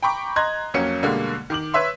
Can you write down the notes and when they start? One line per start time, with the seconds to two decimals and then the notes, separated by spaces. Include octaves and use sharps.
0.02 G5 A#5 B5 C#6 D6
0.36 D#5 A#5 C6 F#6 G#6
0.74 F2 F#3 A#3 C#4 C#7
1.03 B2 D3 G3 G#3 A#3
1.50 D#3 D6 F#7
1.74 B4 C#5 E5 C6